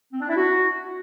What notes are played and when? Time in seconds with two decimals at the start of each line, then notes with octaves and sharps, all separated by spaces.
0.13 C4
0.21 D4
0.29 E4
0.36 F#4